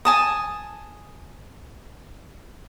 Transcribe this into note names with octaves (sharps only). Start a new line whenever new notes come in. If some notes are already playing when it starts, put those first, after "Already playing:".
G#5 A5 D#6